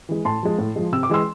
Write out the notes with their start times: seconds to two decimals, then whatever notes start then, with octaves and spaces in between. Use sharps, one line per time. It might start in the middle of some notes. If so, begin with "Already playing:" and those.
0.09 E3 G#3
0.25 A2 A5 C6
0.43 F3 G#3
0.59 A2
0.76 F3 G#3
0.92 C3 E6
1.03 D6
1.09 E3 G#3 C6 E6